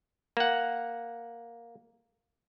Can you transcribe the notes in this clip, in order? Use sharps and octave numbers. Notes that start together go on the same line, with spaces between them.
A#3 F#5